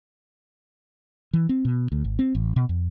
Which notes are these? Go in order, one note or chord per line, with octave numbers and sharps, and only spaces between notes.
E3
C4
B2
D2
G#1
C4
A1
B2
F2